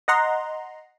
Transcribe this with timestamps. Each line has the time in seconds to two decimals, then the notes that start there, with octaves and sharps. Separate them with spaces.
0.08 D#5 F#5 A#5 C6